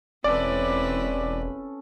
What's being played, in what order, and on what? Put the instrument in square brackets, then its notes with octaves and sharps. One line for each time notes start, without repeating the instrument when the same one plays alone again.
[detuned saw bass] E1 [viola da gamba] C4 E4 B4 [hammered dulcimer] C#4 A4 [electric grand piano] D5